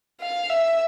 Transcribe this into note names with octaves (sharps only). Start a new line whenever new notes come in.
F5
E5